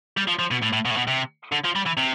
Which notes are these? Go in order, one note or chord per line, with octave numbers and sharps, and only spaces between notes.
G3
F3
F3
B2
A2
A2
B2
A2
B2
C3
D3
F3
G3
E3
C3